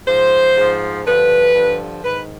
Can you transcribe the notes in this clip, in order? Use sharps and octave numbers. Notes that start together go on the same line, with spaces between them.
G#2 F3 C5
G#2 F3
G2 D3 F3 B4
G2 D3 F3
G#2 D#3 B4